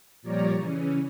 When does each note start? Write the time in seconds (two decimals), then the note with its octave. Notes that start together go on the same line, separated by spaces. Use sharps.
0.22 A#2 F3 G3 C#5 D5 A#5
0.56 C#3 E3 C#4